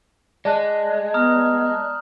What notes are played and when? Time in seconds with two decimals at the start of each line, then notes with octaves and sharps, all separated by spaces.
0.45 G#3 D5 A5 F#6
1.14 B3 A#5 D#6 F6